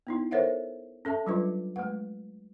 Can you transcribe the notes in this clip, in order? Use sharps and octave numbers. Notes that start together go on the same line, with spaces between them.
B3 D#4 E4
A4 A#4 C5 C#5 E5 F#5
C#4 A4 E5 A5
F#3 G3 D4 F4 B4 D6
G#3 A3 B4 F#5